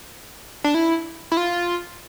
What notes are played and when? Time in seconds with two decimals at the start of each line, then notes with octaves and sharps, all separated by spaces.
0.64 D4
0.74 E4
1.32 E4
1.37 F4